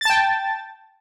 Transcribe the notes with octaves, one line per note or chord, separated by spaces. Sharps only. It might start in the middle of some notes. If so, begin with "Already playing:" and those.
G5 A5 A6